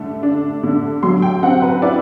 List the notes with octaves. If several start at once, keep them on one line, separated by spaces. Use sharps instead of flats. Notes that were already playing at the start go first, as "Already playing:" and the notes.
Already playing: D3 A3
D4
D3
F#3 C6
G5
C4 F#5
B4
E4 D5